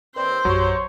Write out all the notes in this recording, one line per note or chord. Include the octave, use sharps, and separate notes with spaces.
D#2 C4 B4 C5 D5
A#1 F#2 F#3 G4 C#5